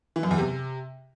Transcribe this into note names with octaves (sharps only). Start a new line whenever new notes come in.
E3
F#2
E2
C3